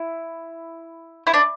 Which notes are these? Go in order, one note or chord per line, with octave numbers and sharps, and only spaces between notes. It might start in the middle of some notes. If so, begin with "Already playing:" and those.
Already playing: E4
E4
D4